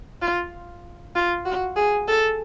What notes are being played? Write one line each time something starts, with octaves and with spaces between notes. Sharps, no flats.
F4
F4
F#4
G#4
A4